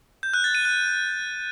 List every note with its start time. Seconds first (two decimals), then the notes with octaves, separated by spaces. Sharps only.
0.23 G6
0.34 F#6
0.44 A6
0.55 D#7
0.65 F#6